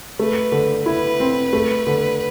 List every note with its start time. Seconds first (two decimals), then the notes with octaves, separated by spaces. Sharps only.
0.19 A3 B4
0.52 D3
0.86 E4 B4
1.20 C4
1.53 A3
1.87 D3